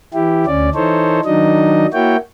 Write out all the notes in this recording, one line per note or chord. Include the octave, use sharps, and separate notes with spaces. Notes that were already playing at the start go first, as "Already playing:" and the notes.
E3 E4 G4
D2 C#4 D5
E3 D#4 A4 C5 C#5
D#3 F#3 D4 D#4 D#5
A#3 E4 F#4 C#5 G5